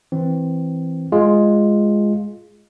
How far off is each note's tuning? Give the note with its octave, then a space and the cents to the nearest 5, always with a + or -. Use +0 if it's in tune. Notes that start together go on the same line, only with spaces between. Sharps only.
E3 +0 C4 +0
G#3 +0 F4 +0 G#4 +0